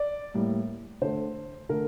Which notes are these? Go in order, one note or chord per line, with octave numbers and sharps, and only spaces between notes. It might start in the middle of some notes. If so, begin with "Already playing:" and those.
Already playing: D5
A2 G3 A#3
D3 A3 C5
D3 A3 A#4